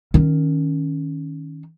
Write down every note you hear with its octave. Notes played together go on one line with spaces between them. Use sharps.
D#3 C#4